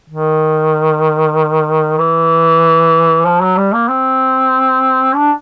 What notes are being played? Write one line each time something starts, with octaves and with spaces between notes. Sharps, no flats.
D#3
E3
F3
F#3
G3
A#3
C4
D4